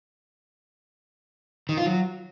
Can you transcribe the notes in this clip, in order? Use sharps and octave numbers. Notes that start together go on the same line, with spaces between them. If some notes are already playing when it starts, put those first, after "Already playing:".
D#3
F4
F#3